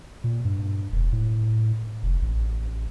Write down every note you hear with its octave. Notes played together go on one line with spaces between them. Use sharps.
A#2
G2
E1
A2
F1
A1